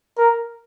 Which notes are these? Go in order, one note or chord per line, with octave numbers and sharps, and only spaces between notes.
A#4